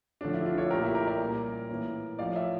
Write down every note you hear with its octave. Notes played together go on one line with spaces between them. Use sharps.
D3 F3 A3 C#4 D4
E4
D4 F4
A4 C#5
A#2 A3 C#4 G4 A#4
E4 G4
G4 A#4
A#4 D5
A#2 G3 A#3 C#4
A2 E3 A#3 C#4
A2 F3 C#4 D5 F5
C#5 E5